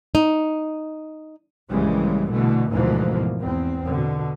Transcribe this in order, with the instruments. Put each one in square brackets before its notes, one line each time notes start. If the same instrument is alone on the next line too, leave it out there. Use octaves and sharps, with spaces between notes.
[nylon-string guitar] D#4
[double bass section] A#1 G2 C#3 E3 G3 G#3
B2 D3 E3 A3
D2 G#2 B2 E3 F3 A#3
E2 C4
B2 D3